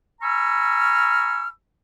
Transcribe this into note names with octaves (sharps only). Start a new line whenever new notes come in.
G#5 A#5 B5 C#6 E6 F6